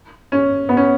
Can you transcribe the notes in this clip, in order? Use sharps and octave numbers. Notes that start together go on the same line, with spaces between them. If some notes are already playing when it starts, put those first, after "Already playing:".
C#4
B3
C#4